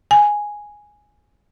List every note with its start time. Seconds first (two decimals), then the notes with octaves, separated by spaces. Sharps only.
0.11 G#5